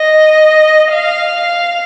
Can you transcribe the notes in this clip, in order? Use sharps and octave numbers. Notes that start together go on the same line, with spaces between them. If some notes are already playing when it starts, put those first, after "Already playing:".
Already playing: D#5
F5